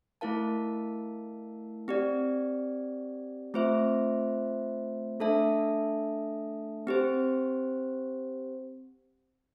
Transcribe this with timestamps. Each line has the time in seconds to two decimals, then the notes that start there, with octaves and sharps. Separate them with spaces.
0.21 A3 E4 A#4 F5 A5
1.88 C4 G4 D5
3.54 A3 C4 F4 C5 E5
5.20 A3 D4 A4 E5 A5
6.87 C4 G4 C5